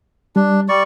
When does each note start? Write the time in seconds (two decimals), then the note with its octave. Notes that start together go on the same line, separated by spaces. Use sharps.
0.36 G3 D4
0.69 G3 D5 C#6